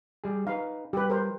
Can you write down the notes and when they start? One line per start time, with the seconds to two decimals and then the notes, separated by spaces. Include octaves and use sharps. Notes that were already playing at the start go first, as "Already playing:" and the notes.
0.24 G3 G#4
0.47 D#4 B4 F5
0.93 G3 G4 B4
1.10 A#4 C5